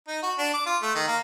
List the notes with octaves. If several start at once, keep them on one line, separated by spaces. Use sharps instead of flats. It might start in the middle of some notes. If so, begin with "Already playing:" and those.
D#4
F#4
D4
D6
F4
A3
D#3
A#3